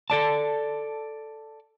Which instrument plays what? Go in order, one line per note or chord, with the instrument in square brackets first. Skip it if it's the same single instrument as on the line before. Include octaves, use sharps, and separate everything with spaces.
[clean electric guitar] A4 D5 A5